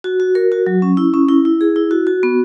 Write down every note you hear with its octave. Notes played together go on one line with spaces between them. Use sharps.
F#4
F#4
A#4
F#4
F#3
C#4
E4
C#4
E4
E4
G#4
E4
F#4
F#4
B3